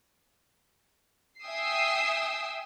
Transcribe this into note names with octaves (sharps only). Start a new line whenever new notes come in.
E5 G5 G#5 D#6 E6 C7